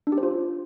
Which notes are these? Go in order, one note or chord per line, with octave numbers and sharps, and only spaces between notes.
D4
G4
C5
F4